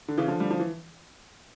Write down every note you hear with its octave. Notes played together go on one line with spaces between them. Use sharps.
D3
C#3 E3
D3 F3
G3
F3
E3